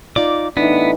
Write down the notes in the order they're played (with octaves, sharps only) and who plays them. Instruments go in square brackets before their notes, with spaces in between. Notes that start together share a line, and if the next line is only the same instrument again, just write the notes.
[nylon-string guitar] D#4 F4 D5 [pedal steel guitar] D6
[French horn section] A2 E3 D#4 [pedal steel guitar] B3 [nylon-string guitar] D4